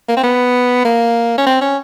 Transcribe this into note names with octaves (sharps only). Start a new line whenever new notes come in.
A#3
C4
B3
A#3
C#4
C4
C#4